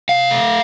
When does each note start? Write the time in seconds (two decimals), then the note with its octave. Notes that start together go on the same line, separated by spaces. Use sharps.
0.09 C3 F5
0.31 A3